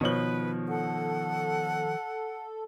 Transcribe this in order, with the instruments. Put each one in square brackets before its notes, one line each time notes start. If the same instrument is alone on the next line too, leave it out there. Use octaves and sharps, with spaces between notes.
[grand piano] B2 C#5 F#7 [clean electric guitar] D#3 F3 [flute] B4
[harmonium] A4 [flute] F#5